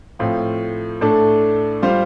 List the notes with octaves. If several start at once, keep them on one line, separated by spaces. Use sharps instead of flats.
A2 F3 C4 F4
A2 A3 D4 A4
G3 F4 C5